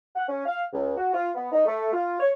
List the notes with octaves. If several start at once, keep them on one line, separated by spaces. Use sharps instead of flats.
F#5
C#4
F5
C#2
F#4
F4
B3
D#4
A3
F4
C#5